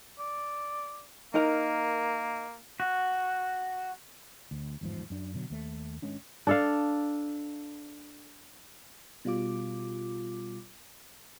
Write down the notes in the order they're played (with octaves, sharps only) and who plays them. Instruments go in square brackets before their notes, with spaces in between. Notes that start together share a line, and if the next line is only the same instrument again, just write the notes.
[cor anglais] D5
[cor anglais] A#3 [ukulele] D#4 A#4 A#5
[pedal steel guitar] F#4
[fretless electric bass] D2
G1 E2 G#2 F3
F#2 D4
B2 D3 F#3
D#2 A3
G#1 G#3 C#4 D4
[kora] D4 A4 F5
[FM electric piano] B2 G3 F4 D6